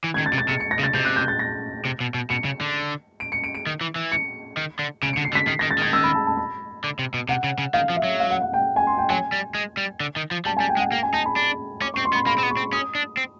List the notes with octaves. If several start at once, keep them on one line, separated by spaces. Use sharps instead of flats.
E3
G#6
D#3
A6
C3
A6
C3 C#7
C#7
A#6
C#3
A6
C3 G6
F#6
G6
A6
A#6
C3
B2
B2
B2 C#7
C#3
D3
D7
C#7
D7
D7
D#3
E3
E3
C#7
D#3
D3
C#3 D7
C#7
D3
C7
D3
B6
D#3 C7
A#6
D#3
A6
D#3 G#6
E6
B5
A5
A5
B5
D3
C3
B2
C3 F#5
C#3
C#3
D#3 F5
F3
E5
F#3
F5
F#5
F#5
G5
G#5
C6
G5
F#3 G#5
G3
G#3
G3
D3
D#3
F3
G3 A5
G#5
G3
G5
G#3
F#5
A#3 G5
G#5
D#4 A5
B5
D4
C#4 D6
C#6
C4
C6
B3
B5
A#3 B5
C4
B3
C#6
C4
C#4 D#6
D4
C4